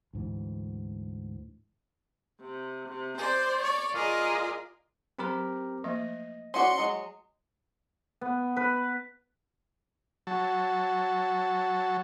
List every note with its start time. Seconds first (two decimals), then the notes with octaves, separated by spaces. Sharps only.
0.13 D2 G#2 E3
2.41 C3
2.88 C3
3.18 C5 D5
3.61 C#5 D5
3.92 F4 G#4 A#4 D5 D#5
5.18 F#3 C4 G4 A#4 C6
5.84 F3 A3 A#3 D#5
6.54 C#4 F#4 D5 C6 C#7
6.78 F#3 G#3
8.21 B3
8.56 B4
10.27 F#3 A5